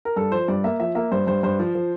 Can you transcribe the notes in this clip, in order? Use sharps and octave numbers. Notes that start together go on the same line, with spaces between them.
A#4
G2 A4
F3 C5
G2 D5
A#3 E5
F3 E5
A#3 E5
G2 C5
G2 C5
G2 C5
F3
F3